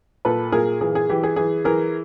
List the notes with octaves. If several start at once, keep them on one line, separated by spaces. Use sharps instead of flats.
A#2 A4 B4
A#2 G#4 A#4
E3 G#4
G#4
E3 G4
G#4
E3 G#4
E3 G#4 A#4